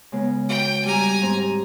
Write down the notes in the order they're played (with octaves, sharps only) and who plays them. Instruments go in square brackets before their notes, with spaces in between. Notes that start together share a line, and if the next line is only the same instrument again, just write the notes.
[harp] C#3 G#3 B3
[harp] F#4 [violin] G5
[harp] G3 G4 [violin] G#5 A#5
[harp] G#2 C4 G#4